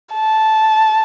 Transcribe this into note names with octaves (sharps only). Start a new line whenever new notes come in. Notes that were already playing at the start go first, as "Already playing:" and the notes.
A5